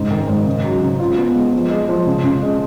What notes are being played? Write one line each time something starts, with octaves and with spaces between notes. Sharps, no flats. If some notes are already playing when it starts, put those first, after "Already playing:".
Already playing: G#2 C#3
D#3
G#2
C#3
F#3
C#3
F4
B3
G#3
F3
G#3
F3
C#3
C#3
G#3